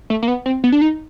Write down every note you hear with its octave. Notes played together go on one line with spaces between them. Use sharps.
A3
A#3
B3
C4
B3
D4
D#4